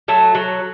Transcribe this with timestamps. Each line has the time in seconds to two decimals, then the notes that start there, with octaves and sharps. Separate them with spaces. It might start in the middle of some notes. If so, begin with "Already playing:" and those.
0.08 F#3 A3
0.35 F#3